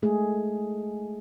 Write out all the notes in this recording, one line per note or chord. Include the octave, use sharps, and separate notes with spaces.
G#3 A3 G#4